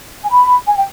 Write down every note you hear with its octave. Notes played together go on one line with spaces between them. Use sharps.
G#5
B5
G#5
G5